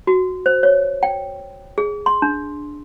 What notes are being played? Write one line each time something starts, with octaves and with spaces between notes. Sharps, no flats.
F#4
C5
C#5
G5
G#4
C6
D4